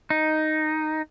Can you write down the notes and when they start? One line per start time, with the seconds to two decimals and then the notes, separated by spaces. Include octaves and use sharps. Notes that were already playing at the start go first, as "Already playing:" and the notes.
0.10 D#4